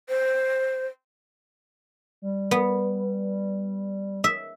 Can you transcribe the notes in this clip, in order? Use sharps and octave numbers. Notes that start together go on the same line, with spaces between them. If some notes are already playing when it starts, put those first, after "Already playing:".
C5
G3
B3
E5